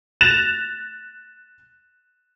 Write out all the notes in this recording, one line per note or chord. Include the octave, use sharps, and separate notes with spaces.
F#6 A6 A#6 E7 F7